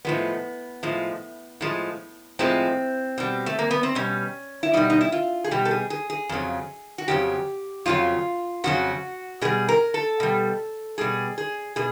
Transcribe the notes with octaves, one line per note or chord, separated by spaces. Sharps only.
A2 F3 G#3 B3
A2 F3 G#3
A2 F3 G#3
A2 F3 G#3 C4
B2 G3
A3
A#3
B3
C4
B2 G3 C#4
E4
B2 G3 D#4
D#4
E4
F4
G#4
B2 G3 G4
A4
G#4
G#4
G#4
F2 C#3 F#3
F#4
F2 C#3 F#3 G4
F2 C#3 F#3 F4
F2 C#3 F#3 F#4
B2 G3 G#4
A#4
A4
B2 G3
B2 G3 G#4
G#4
B2 G#4